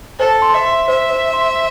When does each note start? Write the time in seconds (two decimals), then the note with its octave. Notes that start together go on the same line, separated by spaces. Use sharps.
0.19 A4 C5
0.42 C6
0.54 E5
0.65 C6
0.88 C5 E5
1.10 C5
1.33 C6